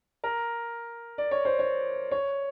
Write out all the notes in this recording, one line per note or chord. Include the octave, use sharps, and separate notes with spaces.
A#4
D5
C#5
C5
C#5
C#5